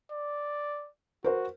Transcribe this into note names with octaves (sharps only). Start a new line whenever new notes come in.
D5
F#4 A#4 C5